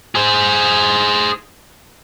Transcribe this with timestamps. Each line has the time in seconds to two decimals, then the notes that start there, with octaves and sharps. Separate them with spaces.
0.15 G#4 C5